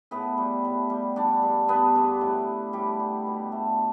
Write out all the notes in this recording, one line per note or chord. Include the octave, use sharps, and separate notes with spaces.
A2 B3 B4
G3
A2
G3
G3 D4 D5
G2
G2 B3 B4
D3
A2
G3
A2 G3 G4
G3
B2
A3